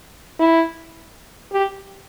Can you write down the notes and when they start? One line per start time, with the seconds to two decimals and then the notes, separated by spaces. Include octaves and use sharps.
0.40 E4
1.52 G4